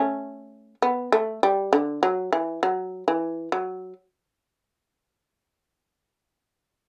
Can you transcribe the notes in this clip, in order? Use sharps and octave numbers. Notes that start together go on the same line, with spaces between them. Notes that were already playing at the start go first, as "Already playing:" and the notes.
Already playing: A3 C#4
B3
A3
G3
D3
F#3
E3
F#3
E3
F#3